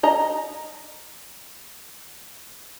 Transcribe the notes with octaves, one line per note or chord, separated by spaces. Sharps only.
D#5 A#5